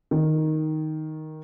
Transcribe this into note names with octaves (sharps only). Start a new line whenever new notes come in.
D#3